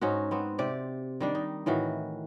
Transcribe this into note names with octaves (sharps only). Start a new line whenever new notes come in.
G#2 C#4 D#4 F#4
B3 C4 F#4
C3 G4 D5
D#3 G3 D4
D#4
A2 D#3 E3 F#4